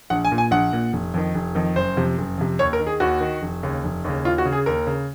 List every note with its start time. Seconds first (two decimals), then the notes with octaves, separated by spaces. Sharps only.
0.10 A#1 F#5
0.25 G#5
0.32 A#2
0.38 G#5
0.51 A#1 F#5
0.73 A#2
0.93 F1
1.14 F2 D#3
1.35 F1
1.55 F2 D#3
1.76 F#1 C5
1.97 F2 C3
2.18 F#1
2.38 F2 C3
2.59 D#2 C#5
2.73 A#4
2.80 D#3
2.87 G#4
3.00 D#2 F#4
3.21 D#3
3.42 F1
3.63 D#2 C#3
3.84 F1
4.04 D#2 C#3
4.25 D#2 F4
4.38 F#4
4.45 C#3
4.52 G#4
4.66 D#2 A#4
4.87 C#3